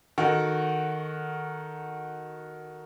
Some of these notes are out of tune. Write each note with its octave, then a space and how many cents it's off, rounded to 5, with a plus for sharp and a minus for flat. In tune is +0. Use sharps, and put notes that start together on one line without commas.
D#3 -5 F#4 +0 A4 +0